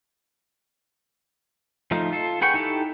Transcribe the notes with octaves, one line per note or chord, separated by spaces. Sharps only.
F3 A3 D#4 F4
F4 A4
G#4 B4 F#5 G5 C#6
D#4 E4 G4 A4